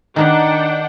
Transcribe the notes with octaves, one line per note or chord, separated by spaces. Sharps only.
D#3 D4 D#4 B4 F#5 G5